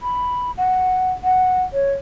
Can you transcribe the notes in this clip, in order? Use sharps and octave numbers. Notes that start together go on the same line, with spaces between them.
B5
F#5
F#5
C#5